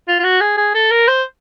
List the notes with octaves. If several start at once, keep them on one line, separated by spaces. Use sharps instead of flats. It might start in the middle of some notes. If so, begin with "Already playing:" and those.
F4
F4
F#4
G#4
G#4
A4
A#4
C5